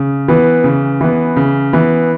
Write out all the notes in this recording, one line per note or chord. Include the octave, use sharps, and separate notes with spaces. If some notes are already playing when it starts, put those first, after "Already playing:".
Already playing: C#3
E3 B3
C#3
E3 B3
C#3
E3 B3